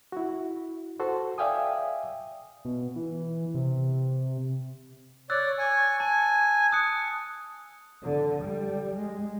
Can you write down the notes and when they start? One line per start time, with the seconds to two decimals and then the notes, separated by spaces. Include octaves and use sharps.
0.12 E4 F#4
1.00 F#4 A4 C5
1.38 D5 E5 F5 G5 G#5 D#6
2.65 B2
2.96 E3
3.55 C3
5.30 C#5 D5 E6 F#6 A6
5.58 G#5 C#6
6.00 G#5 A5
6.72 D#6 F#6 C#7
8.03 D3
8.43 G3
8.94 G#3